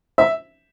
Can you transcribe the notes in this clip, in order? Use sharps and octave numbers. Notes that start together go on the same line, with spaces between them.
E5